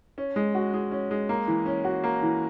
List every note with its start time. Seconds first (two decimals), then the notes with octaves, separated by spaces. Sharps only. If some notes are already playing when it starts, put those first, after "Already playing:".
0.18 C#4
0.36 G#3
0.55 F#4
0.74 G#3
0.91 C#4
1.11 G#3
1.29 A#3
1.47 E3
1.66 C#4
1.85 F#4
2.04 A#3
2.22 E3